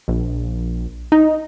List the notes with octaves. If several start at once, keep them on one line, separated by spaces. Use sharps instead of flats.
A#1
D#4